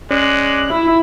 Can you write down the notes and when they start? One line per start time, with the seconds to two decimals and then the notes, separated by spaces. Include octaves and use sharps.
0.11 G#3 C#4 D5 F#6
0.69 E4